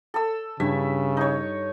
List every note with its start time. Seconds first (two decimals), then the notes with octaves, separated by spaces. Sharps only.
0.14 A4 E6
0.60 G2 C#3 E4 E5
1.17 D#4 C#5